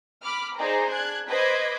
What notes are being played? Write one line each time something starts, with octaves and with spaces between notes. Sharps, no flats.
B5 D6 F6
D#4 G#4 C5 D5 A#5
D4 F#6 G#6
B4 C5 D#5 D6 G#6 B6